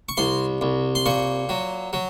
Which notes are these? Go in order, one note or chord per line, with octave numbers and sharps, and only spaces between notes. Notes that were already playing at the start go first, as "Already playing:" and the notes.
C#6
C2 C6
C2
C6
A#2 C#6
F#3
F#3